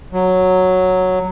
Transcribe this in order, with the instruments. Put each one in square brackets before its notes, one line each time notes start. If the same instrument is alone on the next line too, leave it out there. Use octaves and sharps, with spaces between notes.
[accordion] F#3